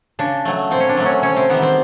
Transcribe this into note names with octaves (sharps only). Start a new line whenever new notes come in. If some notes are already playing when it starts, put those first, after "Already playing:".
C#3 D4
F#3 A3
A#2 C4
C#4
D4
F#3 A3
C#4
C3 C#4
C4
D#3 G3 B3
C4